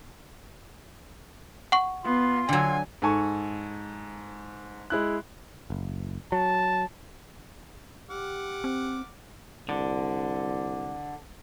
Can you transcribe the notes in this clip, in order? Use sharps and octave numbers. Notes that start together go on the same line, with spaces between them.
F#5 C#6
B3 F4 C6
D3 F#3 G#5
G#2 A4 G#5 C#6
G#3 E4 F#6
F#1
F#3 A5
G4 F#5 D6 F6
C4
C2 D3